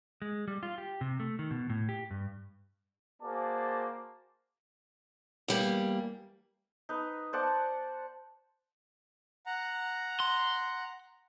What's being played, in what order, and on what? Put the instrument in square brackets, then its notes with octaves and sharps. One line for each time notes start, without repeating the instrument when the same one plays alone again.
[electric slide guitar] G#3
G3
F4
G4
C3
A3
D#3
B2
A2
G4
G2
[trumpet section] A#3 F#4 G#4 C5 D5 A5
[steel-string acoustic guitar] E2 G3 A#3
[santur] D#4 B4
C5 D5 F#5 A5
[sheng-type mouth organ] F#5 A#5
[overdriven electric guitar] C6